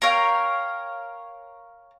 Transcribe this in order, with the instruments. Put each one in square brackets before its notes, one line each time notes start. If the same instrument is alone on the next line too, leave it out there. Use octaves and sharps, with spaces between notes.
[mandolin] A#4 C#5 F5 G5